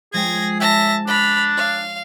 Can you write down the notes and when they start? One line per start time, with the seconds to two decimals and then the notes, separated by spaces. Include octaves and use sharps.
0.13 F3 G#3 G#4 G5 G#6 A#6
0.60 E5 A5 A#6
1.07 D4 B5 D#6 F6
1.57 C#5 F5